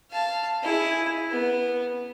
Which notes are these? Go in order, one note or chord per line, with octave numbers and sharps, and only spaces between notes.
F5 A5
E4 G#4
B3